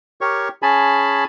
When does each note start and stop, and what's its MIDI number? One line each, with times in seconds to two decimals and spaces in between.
0.21 0.48 67
0.21 0.48 70
0.21 0.48 73
0.21 0.48 85
0.62 1.24 61
0.62 1.24 68
0.62 1.24 80
0.62 1.24 81
0.62 1.24 83